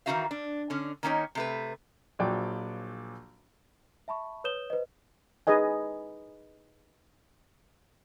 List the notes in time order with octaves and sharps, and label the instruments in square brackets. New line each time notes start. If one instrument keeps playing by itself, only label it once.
[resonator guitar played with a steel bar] D#3 E3 D#4 F#4 E5 F5
D4
D3 C#4
D#3 A#3 C#4 D#4 C#5
C3 A3 B4
[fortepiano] A#1 F3 F#3 F#4 D5 G5
[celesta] E5 A5 B5 C#6
B4 C#5 D#6 G6 E7 G7
B4 C5 D#5
[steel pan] D#4 G#4 B4 D#5 G#5